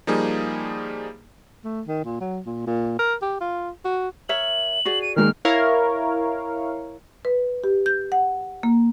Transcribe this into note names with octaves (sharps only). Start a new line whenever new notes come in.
F3 G3 A#3 D#4 G#4
A3
D#3
A#2
F#3
A#2
A#2
A#4
G4
F4
F#4
A#4 C#5 E5 F#7
F#4 G#4 D5
D#7
D#3 G#3 A#3 F6
E4 A#4 C#5 F5
B4
G4
G6
F#5
A#3